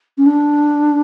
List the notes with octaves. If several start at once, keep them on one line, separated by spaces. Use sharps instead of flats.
C#4
D4